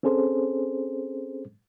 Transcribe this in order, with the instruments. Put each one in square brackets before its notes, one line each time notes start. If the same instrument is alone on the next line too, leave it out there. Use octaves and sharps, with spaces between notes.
[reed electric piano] C4 C#4 G#4 A4 C5